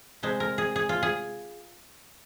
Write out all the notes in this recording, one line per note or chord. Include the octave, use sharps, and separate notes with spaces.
C3 G#3 C5
A#4
G#4
G#4
F4
G#4